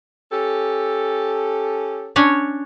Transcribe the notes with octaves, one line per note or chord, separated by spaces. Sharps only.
C#4 G4 A4
C#4 D4 C#5